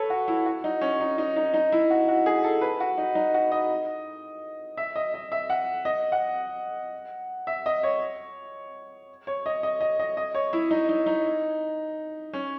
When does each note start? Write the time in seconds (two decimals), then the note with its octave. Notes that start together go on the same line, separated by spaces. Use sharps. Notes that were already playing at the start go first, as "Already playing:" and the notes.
Already playing: A4 B4 C#5
0.10 F#4
0.28 E4
0.46 F#4
0.64 D#4
0.81 C#4
1.00 D#4
1.18 D#4
1.36 D#4
1.54 D#4
1.72 E4
1.90 F#4
2.08 F#4
2.26 G#4
2.44 A4
2.61 B4
2.80 F#4
2.98 D#4
3.15 D#4
3.34 F#4
3.52 D#5
4.77 E5
4.96 D#5
5.14 D#5
5.32 E5
5.50 F#5
5.85 D#5
6.12 F#5
7.47 E5
7.66 D#5
7.83 C#5
9.27 C#5
9.46 D#5
9.63 D#5
9.81 D#5
9.99 D#5
10.17 D#5
10.35 C#5
10.53 E4
10.71 D#4
10.89 D#4
11.06 D#4
12.33 C#4